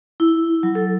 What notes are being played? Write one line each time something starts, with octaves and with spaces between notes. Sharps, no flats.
E4
F#3
A4